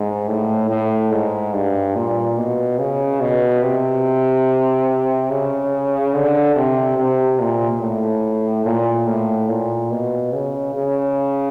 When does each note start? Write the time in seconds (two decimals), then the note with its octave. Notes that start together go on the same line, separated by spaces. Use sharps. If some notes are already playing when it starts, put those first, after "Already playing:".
Already playing: G#2
0.28 A2
0.70 A2
1.11 G#2
1.53 G2
1.95 A#2
2.37 B2
2.79 C#3
3.21 B2
3.63 C3
5.30 C#3
6.14 D3
6.56 C3
6.98 C3
7.40 A#2
7.81 A2
8.65 A#2
9.07 A2
9.49 A#2
9.91 B2
10.33 C#3
10.75 C#3